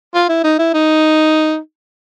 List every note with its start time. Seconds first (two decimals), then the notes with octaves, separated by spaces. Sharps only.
0.14 F4
0.29 E4
0.44 D#4
0.59 E4
0.74 D#4